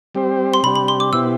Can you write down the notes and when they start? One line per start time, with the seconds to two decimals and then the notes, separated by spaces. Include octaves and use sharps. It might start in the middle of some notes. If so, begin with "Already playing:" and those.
0.15 G3 C4 G4 C5
0.54 C6
0.63 C3 G3 D4 G4 B5
0.76 B5
0.88 C6
1.00 D6
1.13 B2 B3 E4 G4 C5 E6